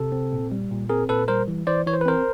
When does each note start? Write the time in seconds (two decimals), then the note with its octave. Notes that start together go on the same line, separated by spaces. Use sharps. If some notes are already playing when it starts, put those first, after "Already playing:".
Already playing: C3 A4
0.12 C4
0.33 A#2
0.52 G3
0.71 A#2
0.89 C4 G#4 A#4
1.09 A#2 A4 B4
1.28 G3 A#4 C5
1.48 E3
1.67 E3 C5 D5
1.87 E3 C#5
1.94 C5
2.01 B4
2.05 C4 A#4 C5